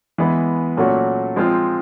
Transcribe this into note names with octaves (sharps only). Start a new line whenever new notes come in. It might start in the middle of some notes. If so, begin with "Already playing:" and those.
E3 G#3 B3
A#2 F#3 A3 C#4 F#4
F3 G#3 C4 F4